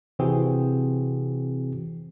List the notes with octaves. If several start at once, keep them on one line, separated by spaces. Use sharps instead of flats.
C3 E3 C4 F#4 G#4